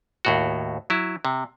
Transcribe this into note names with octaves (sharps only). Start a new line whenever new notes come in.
D#2 A2 F#4
F#3 E4
C3